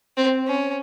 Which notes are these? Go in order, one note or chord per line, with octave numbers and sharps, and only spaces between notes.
C4
C#4